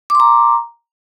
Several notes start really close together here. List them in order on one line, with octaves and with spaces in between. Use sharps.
D6 C6 A#5